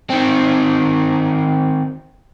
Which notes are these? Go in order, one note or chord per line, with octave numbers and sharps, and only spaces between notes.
D#3 C4